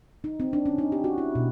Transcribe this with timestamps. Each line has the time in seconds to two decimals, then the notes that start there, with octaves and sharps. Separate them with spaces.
0.24 D#4
0.40 C4
0.53 D4
0.66 C#4
0.78 D#4
0.92 G4
1.04 F#4
1.18 E4
1.35 B2